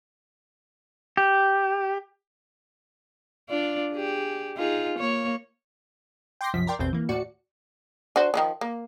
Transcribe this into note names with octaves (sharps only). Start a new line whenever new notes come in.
G4
D4 F4 D5
G4 G#4
D#4 F4 G#4
A#3 C#5
G5 C6 D6 G6 A#6 C7
C2 F#2 F3 B6
A#4 D5 G5 C6
A1 E2 B2 C4 G6
E3 A#3
D#2 A2 F#4 D5 C#7
D4 F#4 C5
D#3 F3 F#3
A#3